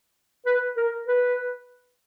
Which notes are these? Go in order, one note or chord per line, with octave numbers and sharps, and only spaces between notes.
B4
A#4
B4